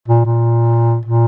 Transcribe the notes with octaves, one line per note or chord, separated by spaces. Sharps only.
A#2
A#2
A#2